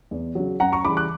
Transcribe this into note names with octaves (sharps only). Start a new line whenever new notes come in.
E2
C#3 F#3
F#2 F#5 A#5
A#5 C#6
C#3 E3 G3 B5 D6
D6 F#6